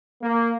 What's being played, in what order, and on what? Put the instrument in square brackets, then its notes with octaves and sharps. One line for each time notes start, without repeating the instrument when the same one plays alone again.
[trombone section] A#3